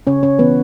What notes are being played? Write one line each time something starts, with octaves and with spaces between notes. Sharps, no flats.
C#3 C#4 C#5
C#4 C#5
E3 B3 B4